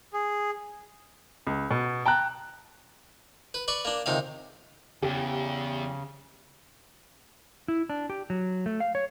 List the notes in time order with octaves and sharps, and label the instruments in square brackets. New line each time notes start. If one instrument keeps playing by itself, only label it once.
[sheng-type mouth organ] G#4
[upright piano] C#2
B2
G5 A5 A#5 F#6
[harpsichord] B4
B4 D5 C#6
A#3 D4
C#2 C3 D#3 F5
[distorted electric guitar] E2 [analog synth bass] C#3 [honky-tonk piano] G4
[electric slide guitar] E4
D4
G4
F#3
A3
F5
C#5